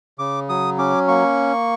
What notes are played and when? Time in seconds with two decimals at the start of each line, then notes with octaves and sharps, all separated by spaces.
0.19 C#3 D6
0.49 F#3 D#6
0.78 C#4 D6
1.08 A#3 C#6